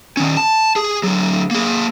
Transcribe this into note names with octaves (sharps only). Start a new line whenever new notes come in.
D#3 C#4
A5
G#4
D3 F#3
A#3 G#4